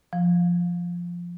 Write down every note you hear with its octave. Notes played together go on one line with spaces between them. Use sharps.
F3